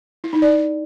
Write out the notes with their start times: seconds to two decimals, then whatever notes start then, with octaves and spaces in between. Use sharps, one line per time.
0.24 E4
0.33 D#4
0.42 D5